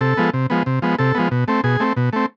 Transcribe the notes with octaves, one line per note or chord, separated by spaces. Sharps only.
C3 A4
F3 G#3 B3
C3
F3 G#3 B3
C3
F3 G#3 B3
C3 A4
F3 G#3 B3
B2
A3 C4
B2 G#4
A3 C4
B2
A3 C4